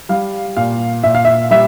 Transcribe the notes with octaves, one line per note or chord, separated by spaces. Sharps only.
G3 F5
A#2 F5
A#2 E5
F5
E5
G3 E5